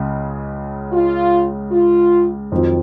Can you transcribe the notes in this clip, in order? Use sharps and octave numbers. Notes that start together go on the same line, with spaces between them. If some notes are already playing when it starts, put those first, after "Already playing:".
Already playing: C#2 C#3 G#3
F4
F4
F2 D#3 F#3 C4 F4